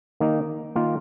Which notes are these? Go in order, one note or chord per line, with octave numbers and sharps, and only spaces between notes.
D#3 A#3 D#4
D#3 A#3 F4